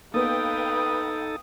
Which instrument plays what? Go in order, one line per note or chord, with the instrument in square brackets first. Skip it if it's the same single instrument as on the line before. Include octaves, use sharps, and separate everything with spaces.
[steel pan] A#3 B3 [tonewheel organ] D#4 A4 [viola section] B4 F5 G5 [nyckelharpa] D#6